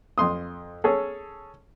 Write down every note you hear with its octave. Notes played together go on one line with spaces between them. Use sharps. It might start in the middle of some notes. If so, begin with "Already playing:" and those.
F2 C6 D#6
C#4 G#4 A4